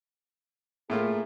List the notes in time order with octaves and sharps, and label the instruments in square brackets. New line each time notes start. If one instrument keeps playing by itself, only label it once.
[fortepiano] A2 A3 F4 [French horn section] A#3 G#4